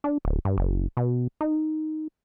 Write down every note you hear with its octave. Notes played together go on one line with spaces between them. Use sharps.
D4
D1
G2
F#1
B2
D#4